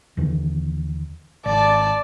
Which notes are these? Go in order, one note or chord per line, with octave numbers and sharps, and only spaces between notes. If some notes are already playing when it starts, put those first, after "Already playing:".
D#2 D3 E3
G#1 D5 A5